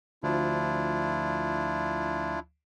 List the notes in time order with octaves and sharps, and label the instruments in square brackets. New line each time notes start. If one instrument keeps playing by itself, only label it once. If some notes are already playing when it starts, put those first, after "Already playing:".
[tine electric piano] D2 F3 [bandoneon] D4 E4 F4